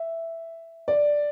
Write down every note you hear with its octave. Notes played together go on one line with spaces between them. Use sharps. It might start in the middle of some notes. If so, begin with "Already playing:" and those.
Already playing: E5
D5